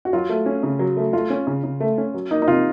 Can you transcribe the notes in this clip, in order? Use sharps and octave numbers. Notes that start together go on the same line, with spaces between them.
F#4
F#3 F4
A3
C#4
C#3
F#3
A3
A3 F4
C#4
C#3
C#3
A3
C#4
F#3
A#3 D#4
D#4
C3 F4